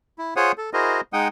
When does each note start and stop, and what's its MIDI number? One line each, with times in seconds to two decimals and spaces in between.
0.18 0.34 64
0.36 0.52 65
0.36 0.52 68
0.36 0.52 72
0.36 0.52 73
0.36 0.52 78
0.36 0.52 87
0.58 0.70 69
0.73 1.01 64
0.73 1.01 66
0.73 1.01 68
0.73 1.01 70
0.73 1.01 72
0.73 1.01 75
1.13 1.28 56
1.13 1.28 63
1.13 1.28 78
1.13 1.28 79
1.13 1.28 87